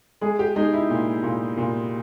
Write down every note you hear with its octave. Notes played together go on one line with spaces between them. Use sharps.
G#3 G#4
G4
G#3 D#4
E4
A#2
A#2
A#2